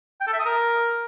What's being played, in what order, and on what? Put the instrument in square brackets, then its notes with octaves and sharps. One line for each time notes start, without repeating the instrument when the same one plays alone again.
[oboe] G5
A4
E5
D#6
A#4